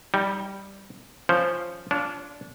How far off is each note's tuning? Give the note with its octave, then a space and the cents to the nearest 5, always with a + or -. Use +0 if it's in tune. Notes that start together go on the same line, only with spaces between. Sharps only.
G3 -5 D#4 +30
F3 +0 C#4 +0 C5 +0
D4 -20 F4 +0 C#5 +25